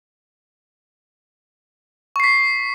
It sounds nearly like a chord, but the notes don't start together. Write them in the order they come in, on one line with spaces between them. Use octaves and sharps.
C#6 C7 B6